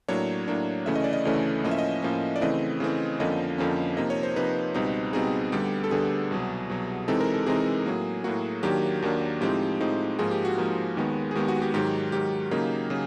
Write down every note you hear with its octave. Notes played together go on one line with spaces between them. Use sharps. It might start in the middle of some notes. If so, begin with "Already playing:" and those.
A2 F#3 A#3 D4 C#5
A2 F#3 A#3 D4
D2 C#3 E3 A3 C#4 E5
D#5
D5
D#5
D2 C#3 E3 A3 C#4
A2 F3 A#3 C#4 D#5
E5
D#5
A2 F3 A#3 C#4
D5
C#3 E3 A3 C4 D#5
C#3 E3 A3 C4
F2 D3 F3 A#3 C#4 D#5
F2 D3 F3 A#3 C#4
C3 F3 A#3 D#4 D#5
C#5
C5
C3 F3 A#3 D#4 B4
C#2 B2 G3 C4 D#4
C#2 B2 G3 C4 D#4 G#4
D2 D3 G3 B3 G4
A4
D2 D3 G3 B3 G#4
C2 B2 F#3
C2 B2 F#3
C3 E3 G#3 C4 D#4 A4
A#4
A4
C3 E3 G#3 C4 D#4 G#4
A2 F#3 A#3
A2 F#3 A#3 F#4
D#2 D#3 F#3 A#3 D4 G4
D#2 D#3 F#3 A#3 D4
A2 F3 G#3 C4 D#4 G4
A2 F3 G#3 C4 D#4
G#2 F3 A#3 G#4
G4
F#4
G#2 F3 A#3
D#2 D#3 G#3 B3
G#4
D#2 D#3 G#3 B3 G4
F#4
G4
G#2 D#3 F#3 G4
G#2 D#3 F#3 G4
C#3 F#3 A#3 D#4
C#3 F#3 G#4